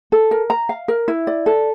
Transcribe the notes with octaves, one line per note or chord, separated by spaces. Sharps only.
A4
A#4
A#5
F5
A#4
E4
D5
A4